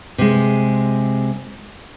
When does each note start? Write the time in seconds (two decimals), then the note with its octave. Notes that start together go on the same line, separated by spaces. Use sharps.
0.18 C3 G#3